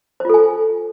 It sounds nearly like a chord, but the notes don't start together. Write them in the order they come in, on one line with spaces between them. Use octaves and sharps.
C5 F4 A4 G#5